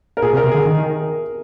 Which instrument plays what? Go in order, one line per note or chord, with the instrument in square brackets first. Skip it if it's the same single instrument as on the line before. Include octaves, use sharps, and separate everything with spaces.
[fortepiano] A#4
[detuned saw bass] A#2 [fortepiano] G#4
[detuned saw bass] C3
[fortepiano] A#4
[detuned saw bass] C3
[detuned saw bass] D3 [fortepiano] G#4
[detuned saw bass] D#3